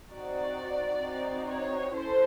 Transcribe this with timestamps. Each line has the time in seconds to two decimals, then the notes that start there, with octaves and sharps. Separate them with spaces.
0.10 C4 D#4 F#4 D5
1.02 C4 D#4 F#4
1.48 C#5
1.93 C#4 E4 A4 C5